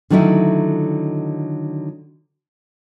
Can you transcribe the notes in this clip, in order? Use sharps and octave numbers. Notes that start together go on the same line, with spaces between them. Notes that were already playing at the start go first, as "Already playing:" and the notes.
D3 D#3 F#3 A3 D#4 E4